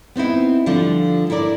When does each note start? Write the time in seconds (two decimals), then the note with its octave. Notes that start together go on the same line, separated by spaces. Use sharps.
0.16 B3 C4 D#4 E4
0.66 D3 F3 G3 F4
1.30 E4 A4 A#4 D5